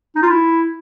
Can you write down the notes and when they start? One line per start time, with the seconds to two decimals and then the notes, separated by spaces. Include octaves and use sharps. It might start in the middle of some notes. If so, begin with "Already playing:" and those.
0.15 D#4
0.22 F4
0.29 E4